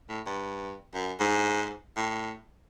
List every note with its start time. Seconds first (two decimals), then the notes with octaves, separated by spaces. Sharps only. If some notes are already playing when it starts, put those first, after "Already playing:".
0.09 A2
0.26 G2
0.94 F#2
1.19 G#2
1.96 A2